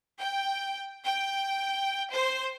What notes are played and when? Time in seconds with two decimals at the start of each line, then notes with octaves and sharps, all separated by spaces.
0.20 G5
1.06 G5
2.13 C5